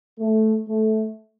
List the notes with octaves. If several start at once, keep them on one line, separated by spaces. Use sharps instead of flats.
A3
A3